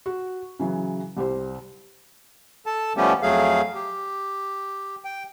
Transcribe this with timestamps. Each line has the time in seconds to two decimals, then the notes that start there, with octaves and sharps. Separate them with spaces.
0.06 F#4
0.60 C#3 E3 F#3
1.16 C2 G3 G4 C5
2.66 A4 A5
2.97 F3 G3 A3 B3 C#4 G4
3.22 F2 F#3 A3 G#4 F5
3.75 G4
5.04 G5